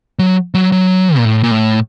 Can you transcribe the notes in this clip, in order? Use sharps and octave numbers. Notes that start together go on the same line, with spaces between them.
F#3
F#3
F#3
A#2
A2
A#2
A2